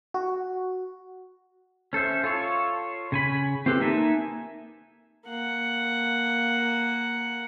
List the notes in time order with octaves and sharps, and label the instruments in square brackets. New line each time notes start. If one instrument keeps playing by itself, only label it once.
[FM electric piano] F#4
[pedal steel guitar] C#4 A4 C5 E5
F4 A4 C#5
C#3 G#5 B5
C4 F4 G4 A4 B4
A#3 D#4 E5 G#5 A5
[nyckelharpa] A#3 F#5